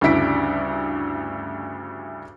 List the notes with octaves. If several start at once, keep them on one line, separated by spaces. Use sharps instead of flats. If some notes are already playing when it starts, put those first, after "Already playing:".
D2 G2 C#3 E4 B6 D7